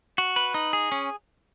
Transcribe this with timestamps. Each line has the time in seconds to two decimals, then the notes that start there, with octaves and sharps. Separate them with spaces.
0.18 F#4
0.36 B4
0.54 D#4
0.73 G#4
0.92 C#4